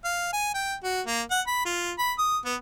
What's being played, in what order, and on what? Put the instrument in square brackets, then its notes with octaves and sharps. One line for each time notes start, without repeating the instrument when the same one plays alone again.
[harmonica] F5
G#5
G5
F#4
A#3
F#5
B5
F4
B5
D#6
B3